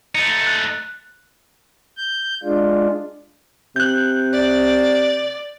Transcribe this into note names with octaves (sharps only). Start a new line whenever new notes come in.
A3 D#4 C#7
F#6
G6
G#3 D4 F4
C3 F#6 G6
D5